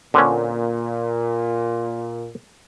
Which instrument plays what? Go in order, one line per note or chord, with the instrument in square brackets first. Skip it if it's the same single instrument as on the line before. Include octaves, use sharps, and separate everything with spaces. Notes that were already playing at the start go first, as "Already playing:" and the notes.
[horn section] A#2 [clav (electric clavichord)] D3 C4 C#4